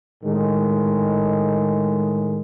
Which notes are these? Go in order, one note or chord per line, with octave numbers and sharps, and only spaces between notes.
A2 D#3 G#3